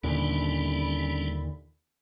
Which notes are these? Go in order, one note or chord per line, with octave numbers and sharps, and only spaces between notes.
D#2 A#2 D3 G3 C#4 D4 A4 B5